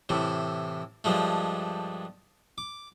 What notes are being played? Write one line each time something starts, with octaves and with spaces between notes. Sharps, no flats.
A2 C3 E3
G2 F3 G#3 A3
D6